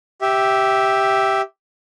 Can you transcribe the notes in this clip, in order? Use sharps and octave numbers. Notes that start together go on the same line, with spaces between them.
G4 E5